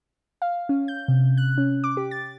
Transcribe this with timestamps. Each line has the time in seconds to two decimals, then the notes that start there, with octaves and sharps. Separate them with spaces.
0.42 F5
0.69 C#4
0.88 G6
1.08 C3
1.37 F#6
1.58 C#4
1.84 D6
1.97 G4
2.11 A6